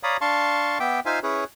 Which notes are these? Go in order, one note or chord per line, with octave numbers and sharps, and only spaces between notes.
C#5 D5 F5 A#5 B5 D#6
D4 F5 A5 C6 C#6
B3 E5 G5 D6
D#4 F4 C5 E5 F5 G#5
C#4 E4 G#4 B4 C#5